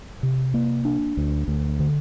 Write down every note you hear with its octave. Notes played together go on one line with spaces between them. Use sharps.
C3
A#3
D4
D2
D2
D3